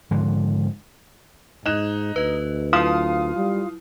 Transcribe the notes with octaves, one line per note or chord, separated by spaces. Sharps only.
G#2 D3 F3
G#2 D#4 D#5 F#6 E7
D2 B4 D#5
F#3 E4 F4 F5 D#6
G3